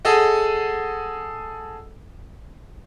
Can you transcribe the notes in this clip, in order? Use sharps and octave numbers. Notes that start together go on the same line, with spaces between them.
G#4 A4 D#5 F#5